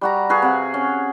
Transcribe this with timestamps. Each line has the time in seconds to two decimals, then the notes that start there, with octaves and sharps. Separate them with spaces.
0.01 G3 F#4 A#5
0.29 F#4 G#4 B4 F5
0.42 C3 F#5
0.74 C#4